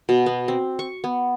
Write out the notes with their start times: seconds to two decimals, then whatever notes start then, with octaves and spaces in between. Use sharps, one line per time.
0.09 B2
0.26 B3
0.48 C4
0.79 C#6
1.04 B3